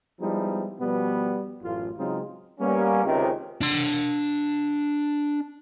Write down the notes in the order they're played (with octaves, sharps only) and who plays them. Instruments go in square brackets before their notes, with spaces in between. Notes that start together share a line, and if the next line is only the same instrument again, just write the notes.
[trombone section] F3 G3 G#3 B3 D#4 E4
B2 F3 G3 B3
A1 F#2 A2 F4
C#3 F#3 G#3 C4 D#4 F4
[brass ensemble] G3 A#3 B3 C#4
C#2 C3 D#3
[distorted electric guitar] D4 C6